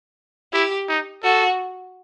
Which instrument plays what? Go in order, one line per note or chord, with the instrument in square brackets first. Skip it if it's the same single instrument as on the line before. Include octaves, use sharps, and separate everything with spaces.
[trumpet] E4 [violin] G4
[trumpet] D#4
[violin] F#4 [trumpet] A4